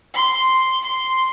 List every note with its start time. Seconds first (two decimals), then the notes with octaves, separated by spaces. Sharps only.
0.14 C6
0.83 C6